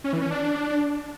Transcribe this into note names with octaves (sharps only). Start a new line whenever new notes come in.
C#4
E3
C#4
D4